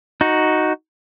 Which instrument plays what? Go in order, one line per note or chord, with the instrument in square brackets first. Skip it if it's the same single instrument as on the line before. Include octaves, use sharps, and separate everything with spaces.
[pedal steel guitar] D#4 F#4